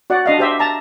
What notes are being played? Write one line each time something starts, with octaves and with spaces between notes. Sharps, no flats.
F#4 D5 F#5
D4 D#5 F5
G4 C5 E5
A5 A#5